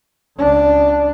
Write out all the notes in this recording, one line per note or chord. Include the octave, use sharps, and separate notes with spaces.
C#2 D4